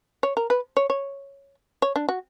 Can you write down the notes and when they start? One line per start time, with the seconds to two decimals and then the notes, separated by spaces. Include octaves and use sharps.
0.23 C#5
0.37 A#4
0.50 B4
0.77 C#5
0.90 C#5
1.82 C#5
1.96 D4
2.09 F#4